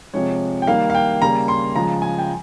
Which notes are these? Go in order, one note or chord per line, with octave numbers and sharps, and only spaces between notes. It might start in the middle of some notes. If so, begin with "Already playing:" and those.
C3 F3 G#3 C#5
G5
D#3 G3 A#3 F5
F5
G5
C#3 G3 A#3 A#5
C6
C#3 F3 G#3 A#5
G#5
G5